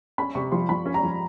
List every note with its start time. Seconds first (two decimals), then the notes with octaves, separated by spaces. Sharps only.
0.18 C#4 B5
0.35 C3 C#6
0.52 F3 C6
0.69 F3 B5
0.86 C#4
0.94 A#5
1.03 F3